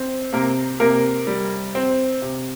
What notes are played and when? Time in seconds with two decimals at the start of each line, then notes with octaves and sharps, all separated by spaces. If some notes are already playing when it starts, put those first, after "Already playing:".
Already playing: C4
0.33 C3 A#3 A#4
0.80 C3 A#3 A#4
1.27 G3
1.75 C4
2.22 C3